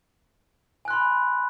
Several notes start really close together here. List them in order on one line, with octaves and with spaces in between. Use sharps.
G#5 F#6 C6 B5